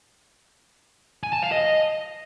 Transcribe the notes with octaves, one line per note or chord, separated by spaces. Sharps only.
G#5
A5
F5
D#5